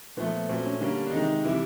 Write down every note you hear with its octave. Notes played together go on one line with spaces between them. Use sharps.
A#2 F3 A3 B3
A#2 F#3 A3 C4
C#4
D3 G3 A#3 C#4
D4
C3 D#3 G#3 D#4
C3 E3 G3 E4